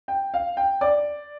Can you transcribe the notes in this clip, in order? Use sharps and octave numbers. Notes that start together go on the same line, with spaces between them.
G5
F5
G5
D5